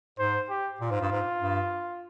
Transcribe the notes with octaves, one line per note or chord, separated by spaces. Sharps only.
G#2 C5
G4
A#2 F4
G#2
G2
G#2
G2